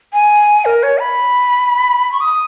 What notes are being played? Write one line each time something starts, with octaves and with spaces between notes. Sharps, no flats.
G#5
A#4
C#5
B5
C#6
D#6